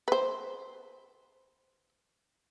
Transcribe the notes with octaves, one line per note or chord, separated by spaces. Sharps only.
B4 C5